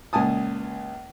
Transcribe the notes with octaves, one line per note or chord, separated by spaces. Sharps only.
C#2 A#2 G#5 A5 D#6